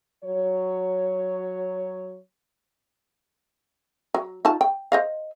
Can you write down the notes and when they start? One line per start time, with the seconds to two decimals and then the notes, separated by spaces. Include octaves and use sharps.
0.24 F#3 C#5
4.14 F#3
4.45 D#4 F4 A5
4.61 G5
4.92 C5 D#5 F5